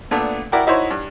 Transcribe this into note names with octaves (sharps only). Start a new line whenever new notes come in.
A#2 A3 B3 D4
E4 F#4 A#4 D5 F#5 G5
D#4 E4 F#4 C5 C#5
G2